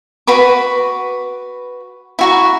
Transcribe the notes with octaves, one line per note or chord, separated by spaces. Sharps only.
F#4 B4 B5 D6
E4 F#4 A#5